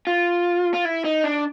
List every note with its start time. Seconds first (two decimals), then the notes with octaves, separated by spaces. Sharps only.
0.07 F4
0.74 F4
0.85 E4
1.05 D#4
1.24 D4